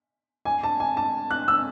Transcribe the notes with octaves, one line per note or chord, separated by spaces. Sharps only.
G#5
A5
G#5
A5
F#6
E6